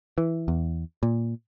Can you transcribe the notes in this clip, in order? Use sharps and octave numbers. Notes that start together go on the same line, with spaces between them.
E3
E2
A#2